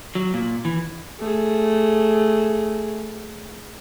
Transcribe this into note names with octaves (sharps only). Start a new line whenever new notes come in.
F#3
A#2
E3
A3 G#4